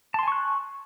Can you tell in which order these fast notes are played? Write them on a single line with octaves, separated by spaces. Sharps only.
A5 C6 G#5 C#6 F#6